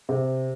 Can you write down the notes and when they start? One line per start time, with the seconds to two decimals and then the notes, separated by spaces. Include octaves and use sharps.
0.09 C3